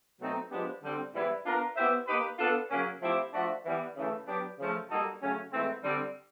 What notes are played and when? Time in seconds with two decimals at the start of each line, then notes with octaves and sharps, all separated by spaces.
0.20 B2 F#3 A3 C4 D#4
0.51 F3 G#3 B3 D4 G4
0.82 D3 G3 C4
1.13 G#2 E3 G3 B3 E4
1.45 B3 D4 F4 A#4
1.76 B3 E4 G4 C5 E5
2.07 A#3 D#4 G4 B4
2.39 B3 D4 F4 A4
2.70 C#3 F#3 A#3 C#4
3.02 F3 A3 C4 E4 G4
3.33 F3 A3 D4 F#4
3.65 E3 G3 B3
3.96 C#3 E3 A3
4.27 F#3 B3 D4 G4
4.59 C#3 F3 A3
4.90 G3 A#3 D#4 F#4 A4
5.22 C#3 F#3 A3 C#4
5.53 G#2 E3 A3 C4
5.84 D3 G3 C4